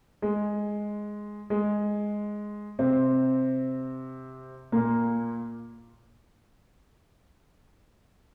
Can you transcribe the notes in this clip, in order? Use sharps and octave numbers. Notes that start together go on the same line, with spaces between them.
G#3
G#3
C3 C4
A#2 A#3